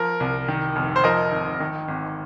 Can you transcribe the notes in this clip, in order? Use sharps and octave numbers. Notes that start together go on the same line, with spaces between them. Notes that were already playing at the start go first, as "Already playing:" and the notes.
Already playing: F3 A#4
C2
D#3
F1
C5
F3 A#4 D#5
G#1
D#3
G#1